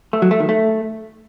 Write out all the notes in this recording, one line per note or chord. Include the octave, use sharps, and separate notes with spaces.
A3
F#3
A3
D#3
A3